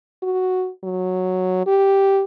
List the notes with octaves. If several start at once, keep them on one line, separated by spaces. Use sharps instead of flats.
F#4
F#3
G4